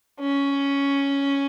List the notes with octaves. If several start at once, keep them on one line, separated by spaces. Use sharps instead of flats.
C#4